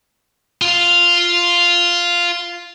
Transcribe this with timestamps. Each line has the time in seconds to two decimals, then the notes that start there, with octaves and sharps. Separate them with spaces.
0.62 F4 F5